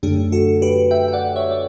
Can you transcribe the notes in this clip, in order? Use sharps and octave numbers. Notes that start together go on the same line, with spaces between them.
F#2 D3 A3 D4 G4
F#4 A4
G4 B4
E5 G5
G5
D5 F#5
C#5 E5
D5